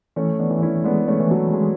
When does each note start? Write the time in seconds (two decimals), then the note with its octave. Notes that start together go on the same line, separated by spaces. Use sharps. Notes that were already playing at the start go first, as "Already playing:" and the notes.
0.16 E3 A3 C#4
0.39 B3 D4
0.51 E3
0.62 C#4 E4
0.84 G#3 B3 D4
1.07 A3 C#4
1.20 E3
1.31 F#3 A3
1.54 G#3